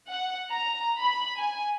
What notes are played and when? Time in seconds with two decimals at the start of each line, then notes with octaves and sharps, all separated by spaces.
0.10 F#5
0.51 A#5
1.03 B5
1.39 G#5